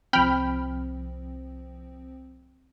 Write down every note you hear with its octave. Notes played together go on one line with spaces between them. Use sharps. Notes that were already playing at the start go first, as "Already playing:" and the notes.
C2 F3 C4 G5 B5 F6